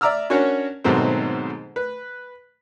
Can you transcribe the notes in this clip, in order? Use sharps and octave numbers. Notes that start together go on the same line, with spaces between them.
D5 E5 A#5 D6 E6 F6
C#4 D4 F#4 A#4 C#5
G#2 B2 D#3 F#3 A3 C4
B4